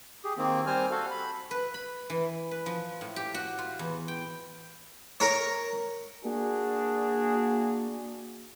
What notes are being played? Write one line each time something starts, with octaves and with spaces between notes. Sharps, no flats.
G4 G#4
D#3 A#3 C4
G3 C4 C5 G#5 F6
F#4 A4 F5
B5
B4
B5
E3
B4
F3
A2
G4
F#4
F4
E2
G5
A#4 C#5
A#3 D4 F#4 G#4